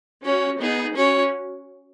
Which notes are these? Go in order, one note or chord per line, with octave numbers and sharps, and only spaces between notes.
C#4 F#4 C#5
B3 D#4 G#4
C#4 F#4 C#5